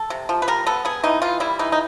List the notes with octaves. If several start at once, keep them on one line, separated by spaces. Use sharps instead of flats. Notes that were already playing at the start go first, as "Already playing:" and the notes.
Already playing: A4
C3
F3
B4
G3 A#4
B3 A4
B3 G#4
E3 D#4
E3 F4
G3 E4
E3 D#4
D#4